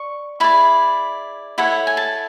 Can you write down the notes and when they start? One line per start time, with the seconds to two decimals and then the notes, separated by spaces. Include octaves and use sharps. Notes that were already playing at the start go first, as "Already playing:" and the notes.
Already playing: D5 C#6
0.40 E4 G#4 D5 B5
1.58 E4 A4 C#5 F#5
1.87 G#5
1.97 A5